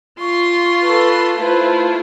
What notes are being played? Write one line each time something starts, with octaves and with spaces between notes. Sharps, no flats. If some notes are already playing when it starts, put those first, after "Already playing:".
F4 C6 C#6
A4 B4
A3 E4 F4 B4 C5 A5